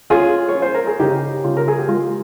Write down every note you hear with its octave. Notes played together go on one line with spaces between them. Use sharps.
C#4 F4 G#4
C#5
C#4
C5
A#4
G#4
C#3 D#4 G4
C#3 F4
A#4
G#4
G4
G#3 F4